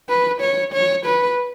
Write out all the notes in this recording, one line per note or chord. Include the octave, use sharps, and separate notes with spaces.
B4
C#5
C#5
B4